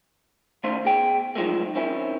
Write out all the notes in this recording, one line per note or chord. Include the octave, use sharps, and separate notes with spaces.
D#3 A3 C#4 C5 F5 C6
B2 G#4 G5
D#3 F3 F#3 G#3 A3
D#3 C4 C#4 E4